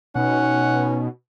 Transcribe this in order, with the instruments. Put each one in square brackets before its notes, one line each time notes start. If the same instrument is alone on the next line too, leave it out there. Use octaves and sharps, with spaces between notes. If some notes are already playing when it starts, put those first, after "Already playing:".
[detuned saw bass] B2 [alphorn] C#4 [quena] D#4 [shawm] F#5